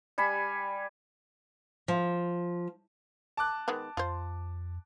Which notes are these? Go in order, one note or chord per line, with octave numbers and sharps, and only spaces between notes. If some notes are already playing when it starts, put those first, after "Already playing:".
G3 G#5 B5
F3
A5 D6 F#6
D#3 G#3 B3
F2 F4 C5